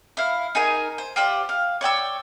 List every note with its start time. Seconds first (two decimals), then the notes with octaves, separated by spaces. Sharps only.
0.17 E4 F5
0.55 D#4 G#4 A#4 G#5
0.98 C5
1.16 F4 G4 C5 D5
1.49 F5
1.81 C#5 D5 G5 E6